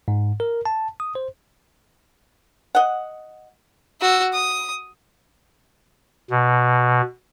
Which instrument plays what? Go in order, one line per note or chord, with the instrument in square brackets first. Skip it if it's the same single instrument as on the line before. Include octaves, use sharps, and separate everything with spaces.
[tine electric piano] G#2
A#4
A5
D#6
C5
[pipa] D#5 F#5
[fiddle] F#4 E6
D#6
[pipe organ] B2